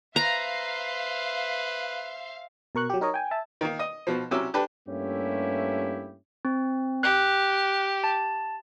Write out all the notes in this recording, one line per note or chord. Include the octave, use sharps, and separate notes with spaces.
B4 C5 E5 F5 A#5
B2 A#4 C#6 F#6
F#3 G4
D#4 A#4 C#5 D#5
G5 G#5
E5 A5
D#3 A#3
D#5
B2 F3
C3 F#3 C#4 E4 D6 E6
D4 G4 A4 B4
G2 A3 A#3 C#4 E4 G4
C4
G4 F#6
A5